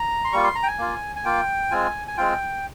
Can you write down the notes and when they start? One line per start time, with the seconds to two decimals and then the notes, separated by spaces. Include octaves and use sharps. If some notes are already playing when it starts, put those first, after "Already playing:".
Already playing: A#5
0.25 C6
0.32 G3 A#3 F4 C#6
0.44 C6
0.55 A#5
0.63 G5
0.67 G#5
0.79 A#3 F4
1.16 G#5
1.25 A#3 F4 G5
1.71 G#3 C4 F4 G#5
2.08 G#5
2.17 G#3 C4 F4 G5